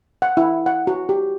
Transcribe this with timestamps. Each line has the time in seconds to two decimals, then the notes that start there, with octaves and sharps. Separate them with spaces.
0.22 F#5
0.37 E4
0.66 F#5
0.87 F#4
1.09 G4